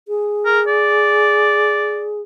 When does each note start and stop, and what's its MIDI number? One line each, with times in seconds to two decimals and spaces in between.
0.08 2.22 68
0.46 0.60 70
0.68 2.12 74